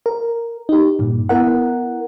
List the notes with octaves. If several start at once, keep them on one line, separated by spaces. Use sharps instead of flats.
A#4
D#4 G4
G2 A#2
B3 E4 A#4 F#5